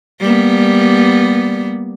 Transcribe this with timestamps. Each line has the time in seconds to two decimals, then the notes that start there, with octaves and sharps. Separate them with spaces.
0.20 G3 A#3 B3